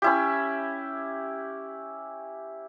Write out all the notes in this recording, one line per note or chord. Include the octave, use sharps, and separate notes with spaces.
C#4 E4 G4